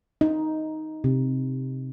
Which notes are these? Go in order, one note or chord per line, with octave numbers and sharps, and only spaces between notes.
D#4
C3